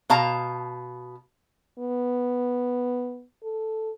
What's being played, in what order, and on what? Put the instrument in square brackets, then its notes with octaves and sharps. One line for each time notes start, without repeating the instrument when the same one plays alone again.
[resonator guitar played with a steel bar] B2 F5 A5 A#5
[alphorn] B3
A4